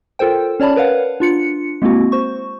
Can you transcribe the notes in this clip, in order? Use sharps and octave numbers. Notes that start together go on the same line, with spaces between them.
F4 A4 A#4 C5 G5
C#4 C#5 D5 A5 B5
A#4 B4 C#5 F5 F#5
D4 F4 C#7
G#3 A#3 C4 E4 F#4
C5 C#6